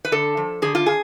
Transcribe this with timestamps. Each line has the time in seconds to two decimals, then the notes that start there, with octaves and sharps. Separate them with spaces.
0.05 B4
0.12 D3 A4
0.37 F3
0.62 D3 G#4
0.75 F4
0.86 G#4